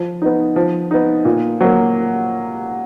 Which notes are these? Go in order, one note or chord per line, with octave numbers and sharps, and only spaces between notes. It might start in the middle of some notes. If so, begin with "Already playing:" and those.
Already playing: F3
B3 D#4
F3
B3 D#4
A#2
F#3 A#3